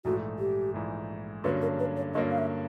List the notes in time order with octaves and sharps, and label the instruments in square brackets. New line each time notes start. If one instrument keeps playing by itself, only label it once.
[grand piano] A#1 G#2 E3 A3 [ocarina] F#4
[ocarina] G4
[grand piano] A#1 G#2 E3 A3
[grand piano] G2 D3 F#3 A#3 C#4 [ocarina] B4
[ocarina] A#4
B4
C#5
[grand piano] G2 D3 F#3 A#3 C#4 [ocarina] D#5
[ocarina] F5
E5